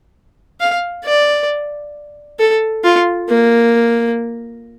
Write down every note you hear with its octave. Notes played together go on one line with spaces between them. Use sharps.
F5
D5
A4
F4
A#3